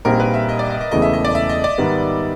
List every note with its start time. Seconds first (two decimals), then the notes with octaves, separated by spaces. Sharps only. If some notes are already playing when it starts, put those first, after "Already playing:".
0.05 A#1 A#2 G3 C4 D#4 A#4
0.20 B4
0.34 E5
0.49 D#5
0.59 D5
0.70 D#5
0.81 D#5
0.91 E1 E2 C#3 E3 A3 D#5
1.02 E5
1.13 D#5
1.25 D5
1.35 E5
1.49 D#5
1.64 D5
1.78 G#2 D#3 G3 B3